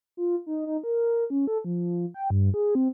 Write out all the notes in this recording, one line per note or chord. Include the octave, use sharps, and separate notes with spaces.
F4
D#4
D#4
A#4
C#4
A4
F3
G5
G2
G#4
C4